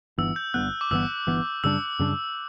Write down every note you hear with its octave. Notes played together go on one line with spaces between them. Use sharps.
G1 G2 E3 B3 E6
G6
G1 G2 E3 B3 F#6
D6
G1 G2 E3 B3 E6
G1 G2 E3 B3
F#2 C#3 G3 D4 E6
F#2 C#3 G3 D4